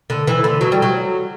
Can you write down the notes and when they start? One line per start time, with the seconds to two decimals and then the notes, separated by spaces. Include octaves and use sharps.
0.10 D3
0.27 E3
0.44 D3
0.61 F#3
0.72 G3
0.82 F#3